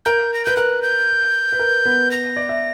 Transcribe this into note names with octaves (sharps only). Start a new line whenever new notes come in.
A#4 G6
A#6
B4 G6
A#4 F#6
G6
B4
A#4
B3 B4
A#6
D5
E5